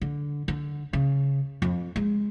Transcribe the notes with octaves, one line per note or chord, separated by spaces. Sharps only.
D3
D3
C#3
F2
G#3